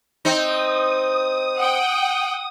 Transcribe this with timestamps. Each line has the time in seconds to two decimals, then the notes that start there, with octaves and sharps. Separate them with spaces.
0.25 C4 D#4 D#6
1.57 F#5 G5